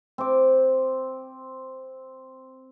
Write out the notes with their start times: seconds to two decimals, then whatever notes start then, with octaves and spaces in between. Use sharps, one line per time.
0.18 C4 D6